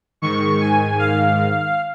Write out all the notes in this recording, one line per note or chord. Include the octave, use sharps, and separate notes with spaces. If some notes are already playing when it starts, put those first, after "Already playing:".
G#2 D#3 C#6
G#5
F5